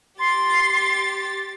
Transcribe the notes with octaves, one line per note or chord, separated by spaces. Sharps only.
G4 C6 A6